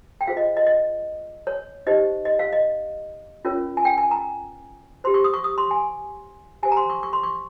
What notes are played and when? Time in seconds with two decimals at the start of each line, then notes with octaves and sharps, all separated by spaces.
0.21 G5
0.27 F4 G#4 C5 F5
0.37 D#5
0.57 D#5
0.67 D#5
1.47 C#5
1.86 D#4 G4 C5 D#5
2.25 D#5
2.39 F5
2.53 D#5
3.45 C#4 F4 A#4 C#5
3.77 G#5
3.85 G5
3.98 G#5
4.11 A#5
5.04 G4 C5 C6
5.14 C#6
5.24 D#6
5.34 C#6
5.44 D#6
5.58 C6
5.71 G#5
6.63 G4 C5 G#5
6.72 A#5
6.77 C6
6.90 C#6
7.03 C#6
7.13 C6
7.23 C#6